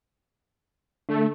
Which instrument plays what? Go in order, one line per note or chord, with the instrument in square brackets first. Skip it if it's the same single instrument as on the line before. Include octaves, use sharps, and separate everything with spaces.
[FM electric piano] D3 [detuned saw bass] A3